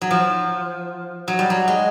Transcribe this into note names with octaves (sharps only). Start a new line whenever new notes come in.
F#3
F3
F#3
G3
F#3
G#3